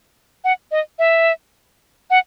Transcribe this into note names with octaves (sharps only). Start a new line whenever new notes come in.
F#5
D#5
E5
F#5